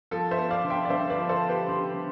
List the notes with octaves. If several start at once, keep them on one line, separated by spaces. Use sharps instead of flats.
F3 A4
C5 E5
B3
D5 F5
D3
E5 G5
D5
D3 C5 E5
B4 D5
F3
A4 C5
B3
G4 B4
D3 G4
D3